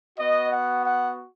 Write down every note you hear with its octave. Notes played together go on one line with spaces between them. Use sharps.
B3 F#4 D#5
F#5
F#5